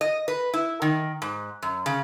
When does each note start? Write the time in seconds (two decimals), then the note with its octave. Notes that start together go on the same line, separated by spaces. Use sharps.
0.01 D#5
0.28 B4
0.54 E4
0.82 D#3
1.22 G#2
1.62 F#2
1.86 C#3